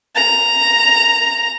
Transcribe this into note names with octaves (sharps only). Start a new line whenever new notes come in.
A#5